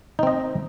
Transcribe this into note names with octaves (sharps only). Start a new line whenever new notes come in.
C4 D#4 D#5